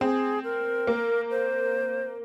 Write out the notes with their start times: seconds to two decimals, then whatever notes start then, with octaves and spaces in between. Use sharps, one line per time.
0.01 C4 G#4
0.44 A#4
0.87 A#3
1.30 C5